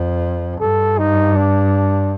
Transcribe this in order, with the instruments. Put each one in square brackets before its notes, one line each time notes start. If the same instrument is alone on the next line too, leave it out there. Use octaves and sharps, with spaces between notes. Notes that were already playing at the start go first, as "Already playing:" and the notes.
Already playing: [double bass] F2
[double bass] G2 [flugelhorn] A4
[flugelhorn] D#4
D4